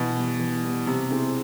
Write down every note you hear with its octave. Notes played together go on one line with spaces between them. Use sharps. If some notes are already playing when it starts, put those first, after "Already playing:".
Already playing: B2 E3
G3 B3
E3
G3 B3
C3 G3
C4 E4 G#4